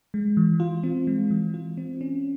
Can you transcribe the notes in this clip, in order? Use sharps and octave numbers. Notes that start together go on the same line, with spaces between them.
G#3
E3
F4
C4
G#3
E3
F4
C4
C#4